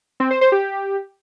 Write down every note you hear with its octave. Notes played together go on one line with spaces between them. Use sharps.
C4
C5
C5
G4